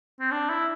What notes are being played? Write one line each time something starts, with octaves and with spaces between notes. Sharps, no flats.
C4
D4
E4